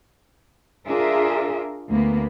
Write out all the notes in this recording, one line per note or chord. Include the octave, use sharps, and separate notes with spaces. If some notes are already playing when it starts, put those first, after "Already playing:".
D4 F4 G#4 A#4 E5
D2 A#3 B3